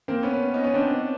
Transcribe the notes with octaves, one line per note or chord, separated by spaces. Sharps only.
A#3 C4
B3 C#4
C#4 D#4
B3 C#4
C4 D4